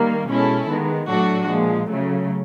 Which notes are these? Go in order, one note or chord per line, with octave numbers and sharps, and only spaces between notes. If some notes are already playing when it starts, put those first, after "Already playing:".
Already playing: D#3 G3 A#3
B2 G#3 C#4 E4 A4
D#3 G#3 B3
A2 F#3 A3 D4 F#4
A#2 F3 G#3
C#3 F#3 A3